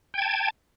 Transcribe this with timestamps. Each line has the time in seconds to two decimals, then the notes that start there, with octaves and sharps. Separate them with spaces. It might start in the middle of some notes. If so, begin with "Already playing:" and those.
0.14 G5
0.18 G#6
0.22 A5